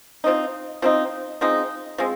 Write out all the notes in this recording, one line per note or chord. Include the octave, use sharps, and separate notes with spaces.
F3 C4 D#4
F3 C4 D#4
F3 G#3 C4 D#4
F3 G#3 C4